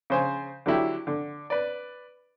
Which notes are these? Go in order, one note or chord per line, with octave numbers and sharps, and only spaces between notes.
C#3 C5 G#5
D3 F#3 E4 G4
D3
B4 D5